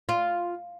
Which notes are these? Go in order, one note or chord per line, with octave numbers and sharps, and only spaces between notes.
F4